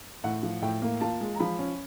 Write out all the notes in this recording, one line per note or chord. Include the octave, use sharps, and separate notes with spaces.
A2 F#5
F3
A2 G5
A#3
F4 A5
G#3
A#5
F3 B5
C#4